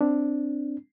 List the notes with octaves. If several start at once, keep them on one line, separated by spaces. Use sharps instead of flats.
C4 D4